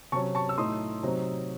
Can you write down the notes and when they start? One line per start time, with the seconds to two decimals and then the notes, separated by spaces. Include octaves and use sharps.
0.12 C3 F#3 C#4 A5 C#6
0.35 A5 C#6
0.49 E6
0.58 A2 F#3 A3 D#4 C6 D#6
1.03 C3 F#3 C4 D#4